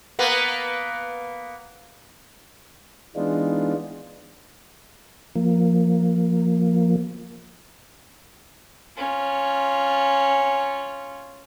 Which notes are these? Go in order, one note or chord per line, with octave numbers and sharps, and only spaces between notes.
A#3 B3
E3 G#3 B3 D4 D#4 F4
F3 A#3
C#4 F4